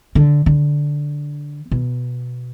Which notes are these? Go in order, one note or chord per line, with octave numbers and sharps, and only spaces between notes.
D3
D3
B2